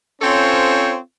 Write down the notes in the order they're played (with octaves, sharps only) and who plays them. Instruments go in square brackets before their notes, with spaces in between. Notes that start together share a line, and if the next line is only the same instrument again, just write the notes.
[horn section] C4 C#4 F4 A4 C5 C#5